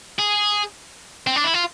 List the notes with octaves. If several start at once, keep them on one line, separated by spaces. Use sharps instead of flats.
G#4
C4
D4
E4
F4